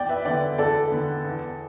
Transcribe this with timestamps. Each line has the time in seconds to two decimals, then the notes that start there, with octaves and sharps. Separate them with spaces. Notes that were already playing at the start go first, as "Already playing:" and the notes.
Already playing: E2 D5 G5
0.09 B4 E5
0.25 D3 B3 D5 G5
0.58 E2 A4 D5
0.91 D3 B3
1.25 E2